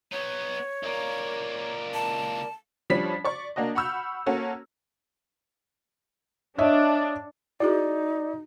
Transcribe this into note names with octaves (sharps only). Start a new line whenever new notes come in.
B3 D#4 C#5
C#2 A#3 A#4 D5
A5
F3 G3 C#4 D4 B5 B6
D5 C#6
A#3 D4 F#4 D#5
F#5 B5 C#6 E6 F6 G6
A#3 C#4 F#4 A4
D4 C#5 D#5 E5
D#4 E4 F#4 G#4 D5